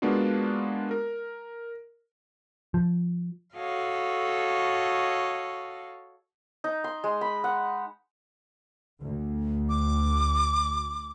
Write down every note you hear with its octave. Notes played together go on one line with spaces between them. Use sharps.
G#3 A#3 B3 D4 F4 F#4
A#4
F3
F#4 A4 C#5 D#5 F5
D#4
C6
G#3
B5
F#5
D2
D6